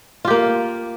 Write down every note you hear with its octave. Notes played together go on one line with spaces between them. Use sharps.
A#3 F4 G4